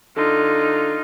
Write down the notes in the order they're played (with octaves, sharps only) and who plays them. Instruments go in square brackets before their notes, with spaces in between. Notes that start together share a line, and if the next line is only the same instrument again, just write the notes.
[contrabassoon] D3 [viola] D#4 F4